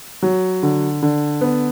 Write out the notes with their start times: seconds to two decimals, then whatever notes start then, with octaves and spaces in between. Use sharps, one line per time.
0.23 F#3
0.63 D3
1.03 D3
1.41 B3